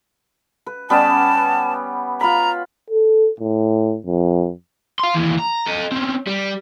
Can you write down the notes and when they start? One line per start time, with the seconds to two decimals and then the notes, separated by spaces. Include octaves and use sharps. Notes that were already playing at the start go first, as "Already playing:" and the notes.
0.66 B4
0.90 G3 B3 C#4 A5
2.21 F4 A#5 B5
2.90 A4
3.40 A2
4.06 F2
4.99 F5 C6
5.14 D#2 E3
5.39 A#5
5.66 A4 D#5
5.92 C4 C#4
6.27 G3